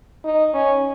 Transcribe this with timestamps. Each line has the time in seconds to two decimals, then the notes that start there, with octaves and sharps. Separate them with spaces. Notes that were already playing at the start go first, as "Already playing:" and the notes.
0.24 D#4
0.54 C#4